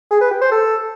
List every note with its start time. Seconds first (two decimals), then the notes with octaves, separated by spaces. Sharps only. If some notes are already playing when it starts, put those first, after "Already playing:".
0.11 G#4
0.21 B4
0.31 G4
0.41 C5
0.52 A4